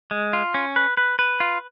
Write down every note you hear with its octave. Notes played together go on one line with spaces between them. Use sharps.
G#3
F4
C#4
B4
B4
B4
F4